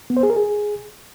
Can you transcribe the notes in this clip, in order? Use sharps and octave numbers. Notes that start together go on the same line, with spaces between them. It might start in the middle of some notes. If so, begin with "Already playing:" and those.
B3
C5
G#4
A#4
G#4